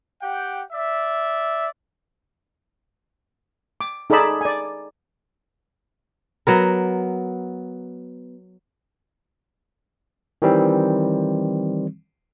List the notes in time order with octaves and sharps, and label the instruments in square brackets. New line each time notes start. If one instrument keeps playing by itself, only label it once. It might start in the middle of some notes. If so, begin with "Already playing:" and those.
[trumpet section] G4 F#5 G5
D5 E5
[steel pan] D6
D#4 G#4 A4 D5 B5 E6
D5 G#5
[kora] F#3 B3 A#4
[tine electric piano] D#3 E3 G3 C4